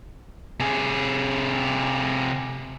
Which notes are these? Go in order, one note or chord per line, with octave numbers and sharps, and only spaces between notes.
C3 G#4